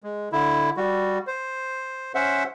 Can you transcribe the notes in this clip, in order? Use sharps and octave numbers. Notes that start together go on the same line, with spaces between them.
G#3
D3 E4
G3 F#4
C5
C#4 C5 E5 F#5